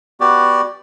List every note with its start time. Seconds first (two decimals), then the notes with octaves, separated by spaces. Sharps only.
0.20 B3 F#4 G4 D5